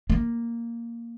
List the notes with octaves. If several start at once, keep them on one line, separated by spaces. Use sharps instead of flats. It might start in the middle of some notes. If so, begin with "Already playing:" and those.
A#3